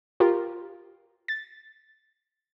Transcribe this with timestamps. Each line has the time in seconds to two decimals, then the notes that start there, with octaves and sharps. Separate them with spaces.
0.20 F4 G4 A#4
1.28 A6